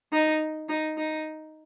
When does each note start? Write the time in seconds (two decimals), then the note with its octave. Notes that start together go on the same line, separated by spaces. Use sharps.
0.13 D#4
0.69 D#4
0.97 D#4